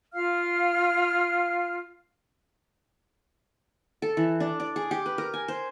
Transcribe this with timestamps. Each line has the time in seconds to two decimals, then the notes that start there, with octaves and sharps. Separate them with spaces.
0.13 F4 F5 F6
4.02 A4
4.17 E3
4.40 D4
4.60 D5
4.76 G#4
4.91 G4
5.06 B4
5.18 A#4
5.34 G#5
5.48 C5